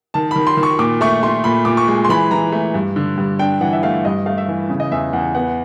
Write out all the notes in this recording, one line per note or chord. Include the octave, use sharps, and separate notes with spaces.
D#3 A5
D#3 B5
C6
D#3
C#6
A#2 D6
A3 C#6
A3 C6
A#2 B5
A#2 D6
C#6
G#3
C6
E3 B5
E3 A#5
A3
G2
D3
G2
D4 G5
E3 F#5
E5
A3 F5
G2 D#5
A3 F5
E5
E3
C#3
D#5
E2 E5
E2 F#5
B3 F#5